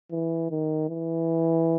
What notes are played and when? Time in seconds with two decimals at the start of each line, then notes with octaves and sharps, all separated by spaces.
0.11 E3
0.51 D#3
0.89 E3